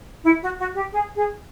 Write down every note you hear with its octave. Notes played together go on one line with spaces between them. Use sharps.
E4
F#4
F#4
G4
G#4
G#4